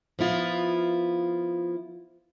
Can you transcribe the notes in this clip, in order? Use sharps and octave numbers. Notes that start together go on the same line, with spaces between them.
F3 B3 E4 F4